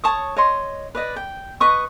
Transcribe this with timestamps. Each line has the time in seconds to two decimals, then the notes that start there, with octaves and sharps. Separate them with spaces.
0.04 C#5 A5 C#6 D#6
0.36 C#5 D#5 C6
0.95 B4 D5 D#5
1.16 G5
1.60 B4 D#5 C#6 D#6